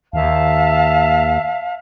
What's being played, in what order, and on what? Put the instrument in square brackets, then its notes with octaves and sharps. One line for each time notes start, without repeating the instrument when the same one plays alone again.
[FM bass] D#2 [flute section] E5 F5 A5